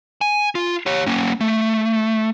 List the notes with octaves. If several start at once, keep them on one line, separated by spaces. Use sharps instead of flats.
G#5
F4
G4 C#5
A#3 C#4
A3